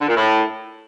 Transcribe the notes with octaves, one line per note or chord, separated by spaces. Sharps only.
D3
A#2
A2